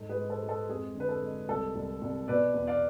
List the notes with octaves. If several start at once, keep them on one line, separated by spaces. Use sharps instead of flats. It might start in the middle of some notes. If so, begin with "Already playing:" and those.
Already playing: G#2 A4
G#4 B4
G#3
A4 C5
G#3
A4
F2 G#4
D3
B4
A4
G#3
C2 A4
C2
C2
B2 B4 D5
E2
D5 F5